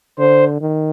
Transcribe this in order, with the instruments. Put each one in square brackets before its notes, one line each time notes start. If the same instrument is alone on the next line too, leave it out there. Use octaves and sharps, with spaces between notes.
[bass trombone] D3 [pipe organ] C5
[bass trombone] D#3